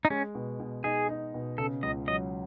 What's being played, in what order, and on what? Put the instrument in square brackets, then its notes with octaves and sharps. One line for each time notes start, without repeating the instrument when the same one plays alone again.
[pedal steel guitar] D#4
[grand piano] G#3 [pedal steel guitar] C#4
[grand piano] B2
B2
[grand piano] D#4 [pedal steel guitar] G#4
[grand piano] D#4
B2
[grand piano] C#3 [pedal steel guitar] A4
[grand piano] C#2 [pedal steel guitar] D#5
[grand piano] F#3 [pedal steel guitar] D#5